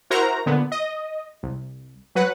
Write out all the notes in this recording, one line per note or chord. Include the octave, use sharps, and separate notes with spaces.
E4 F#4 A#4 C5 A#5
A#2 D3 B3
D#5
C2
F#3 B4 F#5